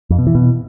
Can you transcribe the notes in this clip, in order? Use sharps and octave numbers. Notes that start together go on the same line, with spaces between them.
F2
B2
E3
B2